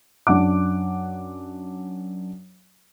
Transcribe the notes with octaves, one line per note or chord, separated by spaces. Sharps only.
F#2 D4 F#5 D6